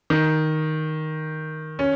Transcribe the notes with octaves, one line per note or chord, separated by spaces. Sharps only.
D#3
C#4